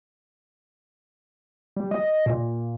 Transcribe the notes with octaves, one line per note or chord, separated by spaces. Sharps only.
G3
D#5
A#2